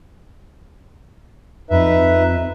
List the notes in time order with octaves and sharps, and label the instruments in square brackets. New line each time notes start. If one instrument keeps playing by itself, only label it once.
[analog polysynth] F2 [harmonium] D#4 B4 E5